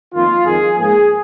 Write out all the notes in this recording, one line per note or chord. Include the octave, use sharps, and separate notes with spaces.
F2 D#3 A#3 F4
F2 D#3 G#3 G#4
G#2 F3 A#3 G#4